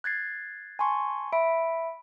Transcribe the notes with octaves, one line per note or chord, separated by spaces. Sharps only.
F#6 G#6 A6 C7
G#5 A5 C6 C#6
E5 B5 D7